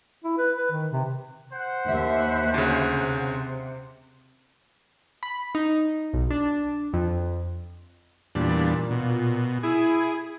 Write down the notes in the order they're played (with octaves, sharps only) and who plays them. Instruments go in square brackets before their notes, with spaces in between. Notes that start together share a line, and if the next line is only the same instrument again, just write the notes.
[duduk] E4
B4
B4
D#3
C3
[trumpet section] C5 F#5
[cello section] D#2 E5
[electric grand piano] D2 C#3
[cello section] C3
[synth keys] B5
D#4
B1
D4
F2
[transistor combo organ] E2 G3 D4 [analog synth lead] A#2
[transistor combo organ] B2
[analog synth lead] E4 [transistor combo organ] G#4